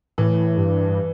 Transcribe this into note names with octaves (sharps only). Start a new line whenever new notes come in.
A2 E3
G2